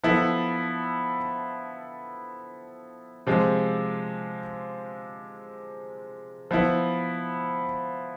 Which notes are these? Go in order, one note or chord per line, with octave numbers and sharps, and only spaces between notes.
F3 B3 E4 A4
C3 F3 G#3
F3 B3 E4